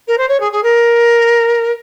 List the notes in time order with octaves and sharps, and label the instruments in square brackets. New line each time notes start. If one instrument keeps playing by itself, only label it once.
[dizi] A#4
C5
C#5
G#4
G#4
A#4